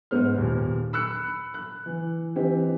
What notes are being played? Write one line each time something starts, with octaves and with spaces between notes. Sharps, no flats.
G#2 B3 C5 F6
D#2 A#2
B5 E6 F#6 C#7
F#6
E3
E3 C4 D#4 G4